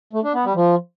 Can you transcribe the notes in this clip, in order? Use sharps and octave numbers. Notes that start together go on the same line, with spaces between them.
A3
D4
B3
G3
F3